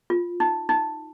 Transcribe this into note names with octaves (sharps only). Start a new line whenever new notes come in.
F4
D#4
D#4